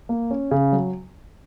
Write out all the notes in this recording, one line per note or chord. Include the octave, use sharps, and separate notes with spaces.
A#3
C#4
C#3
F#3